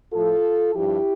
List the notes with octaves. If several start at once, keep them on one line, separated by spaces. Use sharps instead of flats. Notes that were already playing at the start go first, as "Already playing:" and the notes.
A2 F3 F4 A4
G2 F3 E4 G4